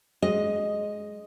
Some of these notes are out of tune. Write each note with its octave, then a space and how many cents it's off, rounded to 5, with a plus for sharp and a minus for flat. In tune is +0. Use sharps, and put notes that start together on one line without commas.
G#3 +15 D#5 +0